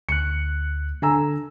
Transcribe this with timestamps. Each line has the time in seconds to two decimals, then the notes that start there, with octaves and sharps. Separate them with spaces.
0.09 D2 F#6 C#7
1.02 D3 A4 G#5 A#5 E6